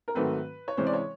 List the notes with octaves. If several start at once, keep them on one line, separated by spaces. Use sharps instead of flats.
A#4
G#2 D#3 F#3 A3 C4 B4
C#5
C3 E3 G#3 C#4 C5
D5
C#5